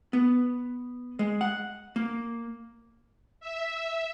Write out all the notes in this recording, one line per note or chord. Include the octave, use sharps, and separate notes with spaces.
B3
G#3
F#5
A#3
E5